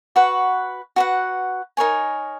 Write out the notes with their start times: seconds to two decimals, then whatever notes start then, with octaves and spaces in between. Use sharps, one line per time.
0.16 F#4 B4 F#5 C#6
0.96 F#4 B4 F#5
1.77 D#4 A#4 C#5 G#5